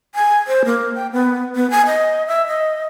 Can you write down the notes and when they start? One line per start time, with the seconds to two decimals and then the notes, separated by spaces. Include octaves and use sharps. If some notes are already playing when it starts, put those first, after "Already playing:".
0.15 G#5
0.47 C5
0.65 A#3
0.95 G5
1.12 B3
1.56 B3
1.71 G#5
1.86 D#5
2.27 E5
2.47 D#5